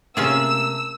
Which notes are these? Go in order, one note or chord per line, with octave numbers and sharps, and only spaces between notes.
C3 A3 A#3 C#4 F4 G#4 E6